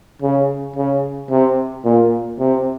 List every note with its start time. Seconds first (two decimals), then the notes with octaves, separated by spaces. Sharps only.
0.22 C#3
0.76 C#3
1.31 C3
1.85 A#2
2.39 C3